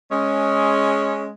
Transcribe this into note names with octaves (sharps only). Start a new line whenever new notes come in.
G#3 C#4